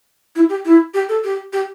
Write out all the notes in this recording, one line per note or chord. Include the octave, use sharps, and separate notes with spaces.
E4
G4
E4
G4
A4
G4
G4